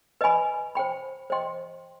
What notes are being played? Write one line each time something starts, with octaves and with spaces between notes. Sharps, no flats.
B4 D#5 G#5 B5
C5 G5 B5
C5 D#5 G5 C6